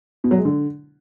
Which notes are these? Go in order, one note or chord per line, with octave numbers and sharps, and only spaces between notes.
B2
F#3
G#3
D3